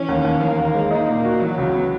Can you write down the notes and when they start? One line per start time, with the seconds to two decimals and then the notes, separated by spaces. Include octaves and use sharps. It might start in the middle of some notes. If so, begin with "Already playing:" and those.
Already playing: E3 C#4
0.09 D#2
0.25 D#2
0.42 E3 A#3
0.58 D#2
0.75 G#3
0.91 A#3 D#4
1.08 A#2
1.24 F#4
1.41 E3 F#3
1.58 C#2
1.74 B3